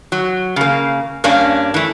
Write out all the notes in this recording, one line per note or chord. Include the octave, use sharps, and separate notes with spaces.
F#3
C#3 A#3
G2 A#3 C#4 D4
E3 A3